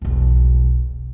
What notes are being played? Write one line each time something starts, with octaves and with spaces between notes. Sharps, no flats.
E1 B1